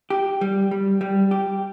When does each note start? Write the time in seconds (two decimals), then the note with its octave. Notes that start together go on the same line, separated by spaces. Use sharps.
0.10 G4
0.41 G3
0.71 G3
1.01 G3
1.31 G4